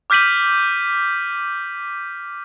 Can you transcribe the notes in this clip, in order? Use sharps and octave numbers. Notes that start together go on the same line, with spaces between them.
D6 F6 G6 B6 D#7 F#7